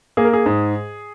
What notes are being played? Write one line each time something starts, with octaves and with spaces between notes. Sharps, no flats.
A#3 G#4
A#4
G#4
G#2